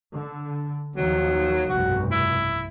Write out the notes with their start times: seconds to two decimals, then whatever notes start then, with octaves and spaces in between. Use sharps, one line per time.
0.11 D3
0.96 D#2 D#3 F3 F#3
1.69 F1 B1 G2 F#4
2.11 E4